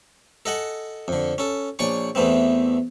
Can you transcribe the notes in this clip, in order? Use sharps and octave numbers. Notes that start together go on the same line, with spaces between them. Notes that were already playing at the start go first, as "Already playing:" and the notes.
A4 D#5 F#5 G#5
F2 D3
C#4 A4
A#1 C#5 D5 G#5 C#6
E2 E3 A3 B3 C4